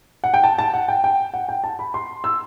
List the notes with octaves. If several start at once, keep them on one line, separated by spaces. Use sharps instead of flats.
F#5
G5
A5
A5
F#5
G5
G5
F#5
G5
A5
B5
C6
E6